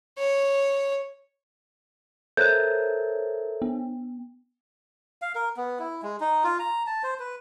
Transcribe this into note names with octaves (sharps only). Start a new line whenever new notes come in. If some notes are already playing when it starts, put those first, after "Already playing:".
C#5
A4 A#4 C5 C#5 E5 F#6 G6
B3
F5
A#4
B3
E4
G#3
D#4
F4
A#5
A5
C5
B4